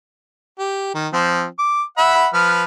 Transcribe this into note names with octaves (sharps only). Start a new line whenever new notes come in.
G4
D#3
F3 C4
D6
E5 F#5 B5
F3 B4 F6